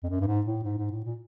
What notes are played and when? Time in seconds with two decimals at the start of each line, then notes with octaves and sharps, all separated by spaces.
0.03 F2
0.10 F#2
0.20 G2
0.27 G#2
0.46 A2
0.64 G#2
0.78 G#2
0.92 A2
1.05 A#2